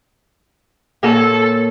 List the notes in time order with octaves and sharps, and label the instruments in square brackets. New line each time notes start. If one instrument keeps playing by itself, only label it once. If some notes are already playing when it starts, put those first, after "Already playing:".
[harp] A#2 C#5 [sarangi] A4